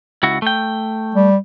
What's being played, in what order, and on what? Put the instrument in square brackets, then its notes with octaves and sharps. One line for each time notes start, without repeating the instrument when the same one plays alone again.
[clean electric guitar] C#2 E4 F#4
A3 G5
[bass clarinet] G3